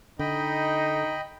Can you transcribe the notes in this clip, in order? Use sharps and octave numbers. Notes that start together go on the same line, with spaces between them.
D3 D#4 D#5 G5 B5